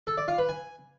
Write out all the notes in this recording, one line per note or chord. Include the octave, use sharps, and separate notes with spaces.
A4
D5
F4
B4
G#5